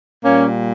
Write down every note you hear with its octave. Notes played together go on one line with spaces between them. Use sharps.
A#2 G3 A#3 C#4